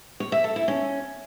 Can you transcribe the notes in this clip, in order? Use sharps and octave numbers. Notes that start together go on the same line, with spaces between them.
C#5
E5
A4
E4
C#4